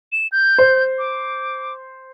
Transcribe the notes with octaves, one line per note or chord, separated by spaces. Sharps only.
E7
G6
C5
D6